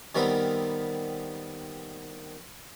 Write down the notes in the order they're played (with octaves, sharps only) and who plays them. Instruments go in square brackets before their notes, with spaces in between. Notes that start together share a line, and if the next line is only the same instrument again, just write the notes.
[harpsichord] D#3 G3 B3 C4 A#4 B5